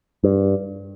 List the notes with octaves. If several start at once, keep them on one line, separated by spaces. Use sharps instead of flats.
G2